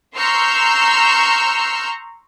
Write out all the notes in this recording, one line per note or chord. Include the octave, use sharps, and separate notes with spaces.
A#5 C6 C#6 E6 F6 G6